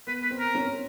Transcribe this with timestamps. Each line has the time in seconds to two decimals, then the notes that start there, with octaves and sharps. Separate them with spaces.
0.07 B3 B4
0.23 B4
0.31 C4
0.39 A#4
0.55 C#4